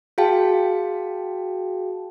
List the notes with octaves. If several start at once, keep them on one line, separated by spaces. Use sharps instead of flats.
F#4 G#4 F5 G5 A5